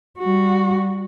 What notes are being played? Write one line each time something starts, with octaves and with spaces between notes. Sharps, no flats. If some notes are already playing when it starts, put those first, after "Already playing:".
G3 F#4